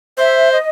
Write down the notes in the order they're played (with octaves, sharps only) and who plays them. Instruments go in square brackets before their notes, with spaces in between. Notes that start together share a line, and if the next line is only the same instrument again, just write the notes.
[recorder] C5 [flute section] E5
[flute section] D#5